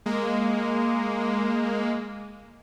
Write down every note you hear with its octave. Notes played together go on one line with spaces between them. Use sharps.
G#3 A#3